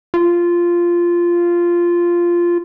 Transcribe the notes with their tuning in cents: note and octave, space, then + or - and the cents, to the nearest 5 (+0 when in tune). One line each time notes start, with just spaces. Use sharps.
F4 -10